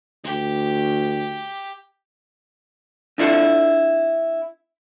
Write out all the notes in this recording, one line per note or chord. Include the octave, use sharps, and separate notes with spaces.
D2 G4
C4 D4 E4 F4 A4 F#5